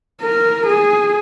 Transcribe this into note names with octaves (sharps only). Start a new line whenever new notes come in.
A#4
G#4